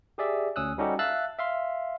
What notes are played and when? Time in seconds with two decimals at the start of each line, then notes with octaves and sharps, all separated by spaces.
0.18 G4 G#4 D5 E5
0.56 D2 C#4 D#6 E6 F#6
0.78 G3 C#4 D#4 F#4 G4 A4
0.99 E5 F5 A5 E6 F#6 A6
1.39 E5 F5 C6